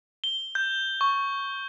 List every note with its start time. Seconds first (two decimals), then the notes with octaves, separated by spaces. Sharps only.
0.24 G7
0.55 G6
1.01 C#6